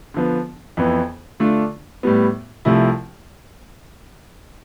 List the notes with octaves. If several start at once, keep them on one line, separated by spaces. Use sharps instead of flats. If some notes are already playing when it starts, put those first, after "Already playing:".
D3 F3 B3
F2 E3 B3
D3 A3 D4 F4
A2 G3 B3
C2 C3 F3 A3 E4